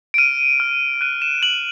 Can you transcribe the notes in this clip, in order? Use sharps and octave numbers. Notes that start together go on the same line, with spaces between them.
D7
F6 D#7
F6
F#6 D#7
E7
F#6 F#7